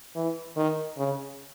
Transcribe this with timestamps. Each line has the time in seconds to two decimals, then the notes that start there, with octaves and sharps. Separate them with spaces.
0.16 E3
0.56 D#3
0.97 C#3